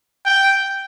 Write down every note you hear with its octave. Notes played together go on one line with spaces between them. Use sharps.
G5